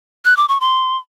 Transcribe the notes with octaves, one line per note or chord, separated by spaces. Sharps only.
F#6
D6
C#6
C6